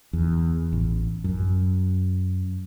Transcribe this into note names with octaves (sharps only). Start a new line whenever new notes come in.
E2
A1
F#2